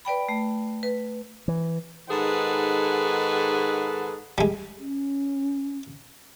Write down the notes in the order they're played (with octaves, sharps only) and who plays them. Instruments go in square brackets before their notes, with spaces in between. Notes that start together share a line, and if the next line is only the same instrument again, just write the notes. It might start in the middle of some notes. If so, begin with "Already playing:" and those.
[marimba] B4 D5 G5 B5
A3
B4
[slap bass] E3
[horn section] G#2 D#3 G#4 A4 B4 F#5
[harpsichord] G3 G#3
[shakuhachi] C#4